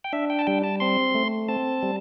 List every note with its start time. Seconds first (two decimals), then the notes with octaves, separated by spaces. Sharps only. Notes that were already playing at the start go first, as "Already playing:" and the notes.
0.04 G5
0.13 D4 E5
0.30 G5
0.39 A5
0.47 G3 G5
0.64 A5
0.80 C4 C6
1.15 A3
1.49 C4 A5
1.83 G3